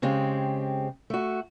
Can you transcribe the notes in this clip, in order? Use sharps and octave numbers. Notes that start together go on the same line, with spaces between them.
C#3 G#3 C4 G4
A3 F#4